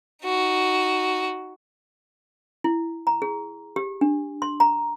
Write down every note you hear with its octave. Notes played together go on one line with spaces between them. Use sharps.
D#4 F#4
E4
A#5
G#4
G4
D4
C6
A#5